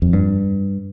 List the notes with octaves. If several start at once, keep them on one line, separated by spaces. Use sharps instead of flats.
F2
G2